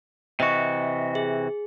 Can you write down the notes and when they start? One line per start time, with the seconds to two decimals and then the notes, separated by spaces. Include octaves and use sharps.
0.40 C3 E3 F#4 D#5 C#6
1.15 G#4